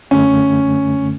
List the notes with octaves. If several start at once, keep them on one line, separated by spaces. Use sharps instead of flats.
F#2 D3 A3 C#4